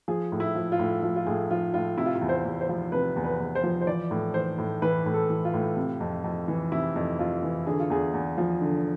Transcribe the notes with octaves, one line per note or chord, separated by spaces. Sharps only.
F3 G#4
A2
E4
F3
F4
A2
F3 F4
F4
A2 G#4
F3 F4
A2 F4
C3 E4
F4
E4
E2
C5
E2
C5
F3
C3 B4
E2
B4
E2
C5
F3
C5
E3 D5
A2
E3 C5
A2
E3 B4
A2
A4
E3
F4
A2
C3
F2
F2
E3
C3 E4
F2
F2 F4
E3
D3 G#4
F4
E2 G#4
E2
F3
D3